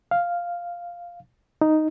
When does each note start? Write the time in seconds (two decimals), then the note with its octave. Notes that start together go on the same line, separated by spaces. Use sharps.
0.11 F5
1.61 D#4